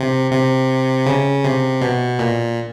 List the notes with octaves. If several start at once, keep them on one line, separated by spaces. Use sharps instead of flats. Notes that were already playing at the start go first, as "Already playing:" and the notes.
Already playing: C3
C3
C#3
C3
B2
A#2